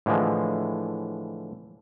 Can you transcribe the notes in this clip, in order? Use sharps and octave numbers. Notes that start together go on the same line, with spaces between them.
A2 D3 E3 F3 G#3